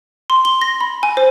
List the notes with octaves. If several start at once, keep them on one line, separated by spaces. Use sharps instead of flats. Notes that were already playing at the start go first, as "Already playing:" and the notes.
C6
G7
A#6
B5
G#5
C5